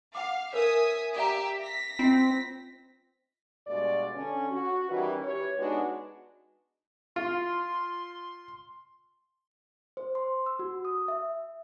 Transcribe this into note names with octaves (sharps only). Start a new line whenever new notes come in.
F5 F#5 D6
A#4 B4 C#5 E5 G#5 D#6
G4 D5 E5 F5 A#5
A#6 B6
C4 F4 D#5
G2 B2 G#3 F#4 D5
D3 C#4
F#4
D#3 E3 G3 C#4 B4
G4 B4 C#5
G#3 B3 D4 D#4 F#4
F4 C6
C5
C6
E6
F#4
D#6
E5